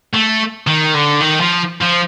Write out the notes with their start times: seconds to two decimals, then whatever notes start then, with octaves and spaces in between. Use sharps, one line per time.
0.14 A3
0.67 D#3
0.94 D3
1.20 D#3
1.40 F3
1.81 F3